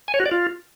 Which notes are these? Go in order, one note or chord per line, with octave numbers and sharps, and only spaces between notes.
G#5
C#5
F#4
D5
F4